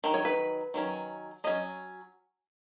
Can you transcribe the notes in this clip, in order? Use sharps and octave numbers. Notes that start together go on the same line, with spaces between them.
D#3 F#3
C#5
B4
D#3 F#3 C#4
F#3 C#4 D#5